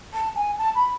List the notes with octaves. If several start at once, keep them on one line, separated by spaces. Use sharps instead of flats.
A5
G#5
A5
B5